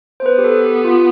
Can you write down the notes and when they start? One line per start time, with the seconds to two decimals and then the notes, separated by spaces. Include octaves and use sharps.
0.20 C5
0.25 B3 B4
0.38 G4
0.44 A4
0.65 G4
0.84 F4